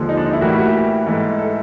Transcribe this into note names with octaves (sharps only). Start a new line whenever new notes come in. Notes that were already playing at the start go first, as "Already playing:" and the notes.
Already playing: D#2 D3 F3 G#3
D#4
D4
D#4
E4
A2 E3 G3 A#3 F#4
G4
F#4
G4
G#2 E3 A3
A4